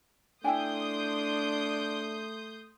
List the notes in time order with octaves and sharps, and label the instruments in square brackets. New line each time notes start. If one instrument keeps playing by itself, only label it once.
[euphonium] A3 [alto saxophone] D4 [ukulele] E4 G5 G#5 [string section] C6 D#6 G6